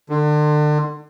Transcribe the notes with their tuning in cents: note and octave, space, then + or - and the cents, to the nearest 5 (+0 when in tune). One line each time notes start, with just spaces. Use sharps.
D3 +35